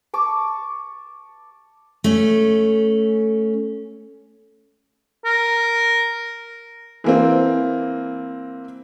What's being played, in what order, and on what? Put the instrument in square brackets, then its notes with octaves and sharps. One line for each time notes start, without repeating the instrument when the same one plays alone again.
[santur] A5 C#6 D6
[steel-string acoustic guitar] A3 C#4
[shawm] A#4
[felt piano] E3 A#3 C4